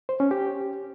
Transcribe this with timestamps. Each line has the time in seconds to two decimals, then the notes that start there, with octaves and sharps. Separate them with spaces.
0.09 C5
0.20 C#4
0.31 G4